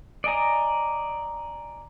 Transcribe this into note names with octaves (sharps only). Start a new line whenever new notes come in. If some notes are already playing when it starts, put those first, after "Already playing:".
D5 D#5 G#5 A#5